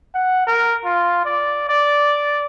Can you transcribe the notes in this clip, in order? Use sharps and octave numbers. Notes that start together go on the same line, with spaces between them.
F#5
A#4
F4
D5
D5